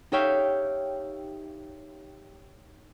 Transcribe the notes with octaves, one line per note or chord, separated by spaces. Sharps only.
D#4 G4 C#5 E5 F5 G5